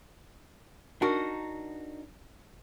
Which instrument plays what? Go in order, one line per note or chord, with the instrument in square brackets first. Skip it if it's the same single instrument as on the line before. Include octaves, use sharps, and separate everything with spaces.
[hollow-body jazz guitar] D4 D#4 F#4 A#4